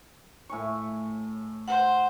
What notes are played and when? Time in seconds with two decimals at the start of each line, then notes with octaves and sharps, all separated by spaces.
0.50 A2 G#5 C#6
1.68 C5 F#5